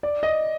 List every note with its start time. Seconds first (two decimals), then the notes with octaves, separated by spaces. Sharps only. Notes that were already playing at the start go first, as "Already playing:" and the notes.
0.03 D5
0.23 D#5